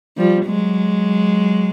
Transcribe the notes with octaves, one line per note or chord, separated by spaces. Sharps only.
F3 G3
F#3 G#3